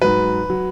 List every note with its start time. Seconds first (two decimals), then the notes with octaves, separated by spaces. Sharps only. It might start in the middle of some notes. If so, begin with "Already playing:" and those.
0.02 G#2 F#3 B4
0.50 F#3